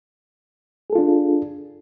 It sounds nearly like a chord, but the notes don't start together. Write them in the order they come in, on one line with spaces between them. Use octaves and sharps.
G#4 A4 F4 D4